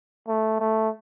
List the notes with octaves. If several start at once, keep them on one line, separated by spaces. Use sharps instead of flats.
A3
A3